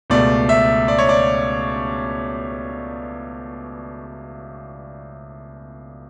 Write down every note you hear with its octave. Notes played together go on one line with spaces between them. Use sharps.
C#2 B2 A3 D5
E5
D5
C#5
D5